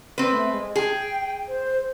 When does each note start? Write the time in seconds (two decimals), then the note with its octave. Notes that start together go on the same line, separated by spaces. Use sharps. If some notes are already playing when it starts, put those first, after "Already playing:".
0.18 C4 B4
0.30 A3
0.52 G#3
0.76 G#4 G5
1.48 C5